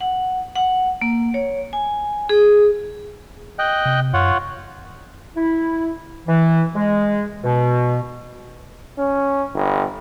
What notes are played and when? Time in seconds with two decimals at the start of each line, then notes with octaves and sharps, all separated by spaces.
0.01 F#5
0.55 F#5
1.02 A#3
1.34 C#5
1.73 G#5
2.29 G#4
3.59 D#5 G5 F#6
3.85 C3
4.14 F#2 F4 C#5 F#5
5.37 E4
6.28 E3
6.75 G#3
7.44 B2
8.98 C#4
9.54 G1